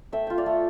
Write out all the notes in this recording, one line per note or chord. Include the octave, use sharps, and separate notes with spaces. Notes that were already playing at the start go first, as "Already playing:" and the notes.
A3 E5 G5
F4 G5
D5 F5
A3